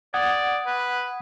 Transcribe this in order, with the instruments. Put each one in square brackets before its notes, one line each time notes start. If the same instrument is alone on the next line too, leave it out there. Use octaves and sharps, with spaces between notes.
[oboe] D5 [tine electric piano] F#5 D#6 G#6
[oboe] B4